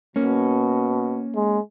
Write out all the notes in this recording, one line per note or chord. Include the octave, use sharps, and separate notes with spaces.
B2 A#3 C#4
G#3